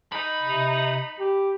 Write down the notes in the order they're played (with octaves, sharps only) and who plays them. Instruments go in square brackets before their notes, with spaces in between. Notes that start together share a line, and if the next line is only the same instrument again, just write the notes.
[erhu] D#4 [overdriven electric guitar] B5
[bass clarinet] C3
G4